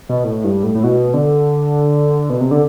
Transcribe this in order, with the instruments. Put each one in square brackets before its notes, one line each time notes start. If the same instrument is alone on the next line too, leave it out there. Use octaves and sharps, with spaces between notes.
[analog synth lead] B2
A2
G2
A2
A2
B2
D3
B2
C3
D3